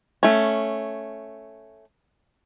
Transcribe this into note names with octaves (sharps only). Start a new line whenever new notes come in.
A3 C#4